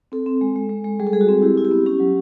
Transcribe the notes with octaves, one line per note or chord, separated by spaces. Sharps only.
C4 A4
C4
G#3
G#3
G#3
G#3
G3 G#4
A4
G3 G#4
F#4
C4
E4 G4
E4
G4
B3
C#4 G4
F#3